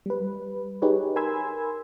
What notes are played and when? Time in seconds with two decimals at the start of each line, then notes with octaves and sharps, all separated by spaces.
0.06 G3 B4
0.82 D#4 G4 G#4 B4 C#5
1.16 A#4 G#5 B5 C6 E6 G#6